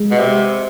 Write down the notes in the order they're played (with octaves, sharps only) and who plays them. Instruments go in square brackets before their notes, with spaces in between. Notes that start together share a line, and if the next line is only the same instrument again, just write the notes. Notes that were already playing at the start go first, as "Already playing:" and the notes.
Already playing: [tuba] G#3
[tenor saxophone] B2
C3